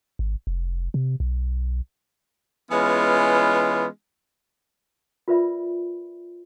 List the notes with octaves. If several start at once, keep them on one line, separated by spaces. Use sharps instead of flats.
G#1
F1
C3
B1
E3 G#3 B3 C#4 F4
F4 A#4 B4 D5 E5 B5